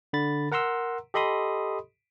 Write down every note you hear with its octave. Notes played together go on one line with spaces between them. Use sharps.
D3 B5 A6
A#4 F#5 A#5 C6 E6
G4 A4 D#5 B5 C6 D#6